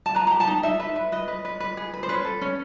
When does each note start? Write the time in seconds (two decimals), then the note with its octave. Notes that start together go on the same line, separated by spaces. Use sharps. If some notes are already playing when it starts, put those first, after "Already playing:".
0.06 A5
0.15 B4 A#5
0.27 A#5
0.31 G4
0.40 A5
0.47 D#4
0.63 D#4 E5
0.80 B4
0.96 B4
1.12 B4 D#5
1.28 B4
1.45 B4
1.60 B4
1.77 G#4
1.94 B4
2.03 C5
2.09 C#4 B4
2.25 A4
2.41 C#4